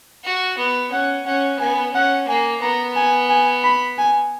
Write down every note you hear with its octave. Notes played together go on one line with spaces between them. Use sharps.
F#4
B3
C#4 F#5
C#4 F#5
B3 G#5
C#4 F#5
A#3 G#5
B3 A#5
G#5
G#5
B5
G#5